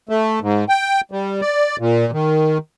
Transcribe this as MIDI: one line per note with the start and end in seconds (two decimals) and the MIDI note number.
0.09 0.39 57
0.42 0.64 44
0.69 1.01 79
1.12 1.41 55
1.42 1.76 74
1.79 2.11 46
2.13 2.58 51